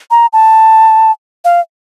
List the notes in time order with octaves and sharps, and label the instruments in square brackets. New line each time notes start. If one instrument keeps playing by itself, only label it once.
[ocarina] A#5
A5
F5